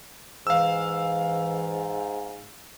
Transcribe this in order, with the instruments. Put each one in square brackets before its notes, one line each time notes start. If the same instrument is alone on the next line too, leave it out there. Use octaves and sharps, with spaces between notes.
[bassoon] G#2 [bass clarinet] E3 [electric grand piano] F5 E6